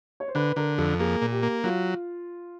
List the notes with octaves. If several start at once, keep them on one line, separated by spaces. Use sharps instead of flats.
C#5
C5
D3 B4
D3 A#4
F2 A4
A#3 G#4
A#2
G4
A#3
F#3 F4